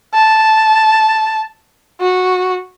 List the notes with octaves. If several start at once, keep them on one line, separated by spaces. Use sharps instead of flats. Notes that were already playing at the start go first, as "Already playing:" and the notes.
A5
F#4